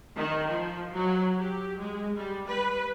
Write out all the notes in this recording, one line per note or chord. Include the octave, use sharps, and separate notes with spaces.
D#3
F3
F#3
G4
G#3
G3
B4